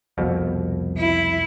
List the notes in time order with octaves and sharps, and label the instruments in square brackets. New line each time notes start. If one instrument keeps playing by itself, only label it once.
[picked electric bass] C2 F2 B2
[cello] E4